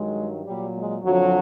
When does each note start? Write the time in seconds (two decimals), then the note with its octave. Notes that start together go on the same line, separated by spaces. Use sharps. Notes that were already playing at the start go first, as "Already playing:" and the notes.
Already playing: G2 D#3 F#3 G#3
0.45 A#2 F#3 G3
0.75 G#3
1.03 F2 D3 F3 F#3